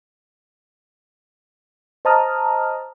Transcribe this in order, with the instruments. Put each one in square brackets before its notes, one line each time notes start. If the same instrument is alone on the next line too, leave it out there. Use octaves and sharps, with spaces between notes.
[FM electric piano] C5 D#5 A5 A#5 D#6 F6